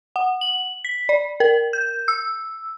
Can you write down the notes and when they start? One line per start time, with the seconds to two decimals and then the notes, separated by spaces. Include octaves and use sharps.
0.16 F#5
0.41 F#7
0.85 B6
1.09 D5
1.40 A#4
1.73 G6
2.08 E6